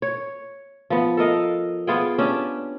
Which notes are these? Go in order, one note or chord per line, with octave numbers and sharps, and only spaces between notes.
C#5
F3 B3
A4 A#4 D#5 F5
B3 F4 G#4 G5
C#4 D4 G4